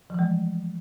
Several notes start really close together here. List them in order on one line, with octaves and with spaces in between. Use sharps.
F3 E3 G#3 A3